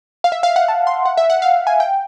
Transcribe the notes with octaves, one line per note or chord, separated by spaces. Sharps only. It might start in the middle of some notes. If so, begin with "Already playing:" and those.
F5
E5
F5
F#5
A5
C6
F#5
E5
F#5
F5
G#5
G5